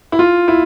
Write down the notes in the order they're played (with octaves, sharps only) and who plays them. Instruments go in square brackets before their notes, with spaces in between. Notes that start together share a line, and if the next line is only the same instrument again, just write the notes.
[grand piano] E4
F4
E4